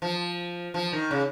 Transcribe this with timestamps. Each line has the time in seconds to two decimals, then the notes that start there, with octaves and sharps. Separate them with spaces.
0.02 F3
0.74 F3
0.93 D#3
1.11 C#3